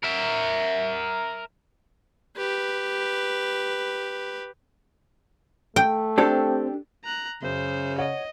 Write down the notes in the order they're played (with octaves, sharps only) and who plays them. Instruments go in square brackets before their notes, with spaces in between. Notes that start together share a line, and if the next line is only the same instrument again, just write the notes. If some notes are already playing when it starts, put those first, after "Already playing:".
[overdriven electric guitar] A#4 E5
[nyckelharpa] G4 B4
[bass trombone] A3 [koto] G5
[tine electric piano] C4 [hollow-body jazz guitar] D4 G4 A4
[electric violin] A#5 F#6
[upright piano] F#2 [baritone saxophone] C#3 [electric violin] C5
[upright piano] C#5 F#5 [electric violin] D#5